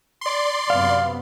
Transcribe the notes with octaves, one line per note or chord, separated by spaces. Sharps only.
D5 C6
F#2 C3 B3 F5